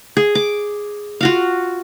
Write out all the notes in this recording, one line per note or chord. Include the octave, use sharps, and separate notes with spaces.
G#4
D6
F4 F#4 F5